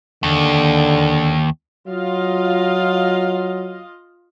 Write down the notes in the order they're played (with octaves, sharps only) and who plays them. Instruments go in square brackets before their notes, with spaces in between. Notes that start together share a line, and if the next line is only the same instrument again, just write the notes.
[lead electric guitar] D#2 [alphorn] D3
[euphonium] F#3 [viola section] F4 D#5 F5